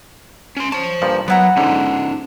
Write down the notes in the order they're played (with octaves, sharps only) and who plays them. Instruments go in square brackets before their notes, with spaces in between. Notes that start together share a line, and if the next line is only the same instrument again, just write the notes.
[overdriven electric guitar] C#4 C6
[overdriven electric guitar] C5 A5 [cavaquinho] C#5
[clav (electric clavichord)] G2 A#2 F3
[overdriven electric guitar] F#3 [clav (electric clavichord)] B3 E4 [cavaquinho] B4 F#5 A#5
[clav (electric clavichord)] G#2 D3 [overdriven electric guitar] C#4 D#4